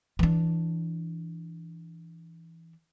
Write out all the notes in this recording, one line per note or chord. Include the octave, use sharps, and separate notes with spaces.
E3 D4